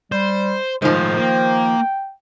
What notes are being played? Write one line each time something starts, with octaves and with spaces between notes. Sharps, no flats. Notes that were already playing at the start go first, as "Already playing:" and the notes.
G3 C5
A2 D#3 F3 G#3 C5
A#3 G5